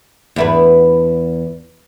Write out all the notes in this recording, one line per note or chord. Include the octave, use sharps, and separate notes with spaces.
E2 E4 B4